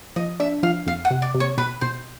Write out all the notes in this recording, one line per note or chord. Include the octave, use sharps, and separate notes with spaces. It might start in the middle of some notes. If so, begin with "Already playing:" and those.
F3 D#5
D4 E5
F3 F5
F2 F5
F#5
C3
D5
C3
C#5
B2 B4
B2 C5